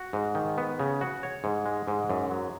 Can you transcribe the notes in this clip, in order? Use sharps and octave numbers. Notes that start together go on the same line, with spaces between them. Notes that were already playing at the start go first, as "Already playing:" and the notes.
Already playing: F#4
G#2
D#3
B3
C#3
F#4
C#5
G#2
G#3
G#2
F#2
F#3